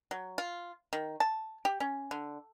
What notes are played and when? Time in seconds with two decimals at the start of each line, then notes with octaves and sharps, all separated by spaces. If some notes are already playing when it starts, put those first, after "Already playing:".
0.11 F#3
0.38 F4
0.93 D#3
1.20 A5
1.65 G4
1.80 C#4
2.11 D3